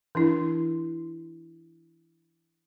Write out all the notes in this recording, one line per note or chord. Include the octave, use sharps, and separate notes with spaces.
E3 D4 E4